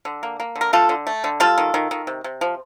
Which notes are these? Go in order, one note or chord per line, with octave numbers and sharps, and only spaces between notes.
D3
A#3
A#3
D3
A#4
A3 F4 A4
D3
A3
D3
G3 F4 A4
D#3
D#3
D#3
C3
C3
F3